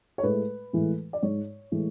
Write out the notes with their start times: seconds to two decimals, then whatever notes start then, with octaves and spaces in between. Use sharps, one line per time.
0.18 C#5
0.23 A2 G#3 B4
0.73 A2 E3 G#3
1.13 D5
1.22 G#2 G#3 C#5
1.72 A2 E3 G#3